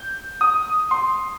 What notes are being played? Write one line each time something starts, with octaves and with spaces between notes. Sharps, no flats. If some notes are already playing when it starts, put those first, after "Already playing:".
Already playing: G6
D#6
C6